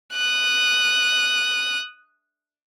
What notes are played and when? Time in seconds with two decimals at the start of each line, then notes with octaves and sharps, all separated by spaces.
0.13 D#6 F#6